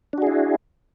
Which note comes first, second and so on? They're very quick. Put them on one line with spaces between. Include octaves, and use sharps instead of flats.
D4 F#4 G#4 E4